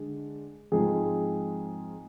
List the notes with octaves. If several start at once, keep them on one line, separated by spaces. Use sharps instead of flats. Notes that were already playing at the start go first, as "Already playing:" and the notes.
Already playing: D3 G#3 D4
G#2 F3 G#3 C4 G#4